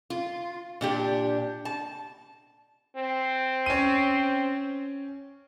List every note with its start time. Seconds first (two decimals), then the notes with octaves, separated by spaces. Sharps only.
0.10 F4
0.81 A#2 D4 G4
1.65 A5
2.96 C4
3.66 C#4 D#7